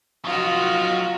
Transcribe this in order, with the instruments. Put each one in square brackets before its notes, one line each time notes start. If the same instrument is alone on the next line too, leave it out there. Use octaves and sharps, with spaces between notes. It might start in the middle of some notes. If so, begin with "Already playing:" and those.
[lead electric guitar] F#3 D#5 [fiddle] F4 F#4